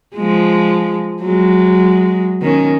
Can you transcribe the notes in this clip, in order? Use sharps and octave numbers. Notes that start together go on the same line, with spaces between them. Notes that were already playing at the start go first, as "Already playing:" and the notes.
F3 G#3
F#3 G#3
D#3 C#4